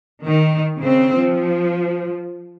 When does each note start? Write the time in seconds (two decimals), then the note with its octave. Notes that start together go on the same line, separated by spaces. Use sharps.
0.24 D#3
0.79 C#3 C4
1.18 F3